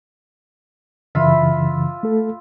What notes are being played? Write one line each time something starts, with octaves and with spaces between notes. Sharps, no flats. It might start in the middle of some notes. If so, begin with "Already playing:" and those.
F#2 C#3 E3 F4 E5 B5
A3 A4